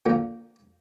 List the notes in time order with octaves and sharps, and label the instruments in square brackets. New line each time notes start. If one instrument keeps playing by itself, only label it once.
[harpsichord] A#2 D3 F3 A#3